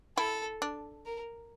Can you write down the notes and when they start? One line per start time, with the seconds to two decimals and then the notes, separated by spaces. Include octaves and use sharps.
0.17 E4 A4
0.62 D4
1.06 A#4